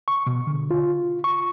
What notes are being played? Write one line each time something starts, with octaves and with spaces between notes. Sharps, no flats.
C#6
B2
D3
F4
C#6